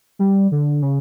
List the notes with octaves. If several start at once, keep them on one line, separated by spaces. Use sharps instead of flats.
G3
D3
C#3